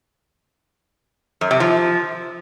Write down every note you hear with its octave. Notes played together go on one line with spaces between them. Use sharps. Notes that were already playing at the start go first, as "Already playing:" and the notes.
F#2
C3
F3